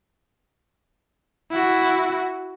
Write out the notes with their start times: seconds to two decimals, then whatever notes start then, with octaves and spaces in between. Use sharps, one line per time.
1.51 E4 F#4